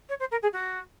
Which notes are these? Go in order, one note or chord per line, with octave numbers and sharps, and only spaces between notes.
C#5
C5
A#4
G#4
F#4